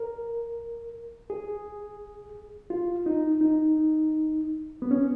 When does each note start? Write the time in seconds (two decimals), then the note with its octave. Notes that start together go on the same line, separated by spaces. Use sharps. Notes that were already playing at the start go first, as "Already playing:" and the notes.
Already playing: A#4
1.30 G#4
2.70 F4
3.06 D#4
3.41 D#4
4.82 B3
4.91 C#4